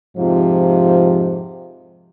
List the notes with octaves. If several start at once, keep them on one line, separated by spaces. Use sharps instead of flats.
F2 G#2 C3 F3